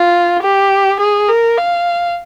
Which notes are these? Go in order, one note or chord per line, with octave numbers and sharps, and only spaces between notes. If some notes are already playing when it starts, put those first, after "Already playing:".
Already playing: F4
G4
G#4
A#4
F5